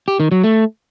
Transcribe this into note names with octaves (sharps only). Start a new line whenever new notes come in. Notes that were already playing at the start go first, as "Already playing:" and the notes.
G4
D#3
F#3
A3